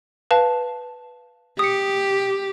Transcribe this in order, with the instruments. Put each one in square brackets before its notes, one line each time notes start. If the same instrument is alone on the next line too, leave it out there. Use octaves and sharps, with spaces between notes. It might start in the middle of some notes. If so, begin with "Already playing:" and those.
[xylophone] B4 F5 A5
[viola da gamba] G4 [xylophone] D#6 C#7